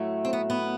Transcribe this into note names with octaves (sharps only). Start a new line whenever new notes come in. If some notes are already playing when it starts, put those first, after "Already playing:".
Already playing: A2 F#3 A3
C4
B3
B3